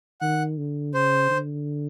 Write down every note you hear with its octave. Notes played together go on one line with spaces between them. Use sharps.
D#3 F#5
D3
C#3 C5
D3